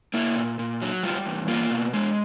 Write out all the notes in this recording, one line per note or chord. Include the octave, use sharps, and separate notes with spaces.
A#3 E4
A#2
A#2
F#3
G3 F4
E2
A#3 F4
B2
G#3